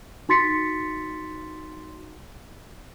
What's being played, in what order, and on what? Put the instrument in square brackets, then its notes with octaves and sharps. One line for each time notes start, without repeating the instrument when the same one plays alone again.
[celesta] D#4 F#4 C6 A6 B6 C#7